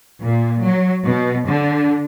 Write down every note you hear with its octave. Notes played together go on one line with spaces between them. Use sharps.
A#2
F#3
B2
D3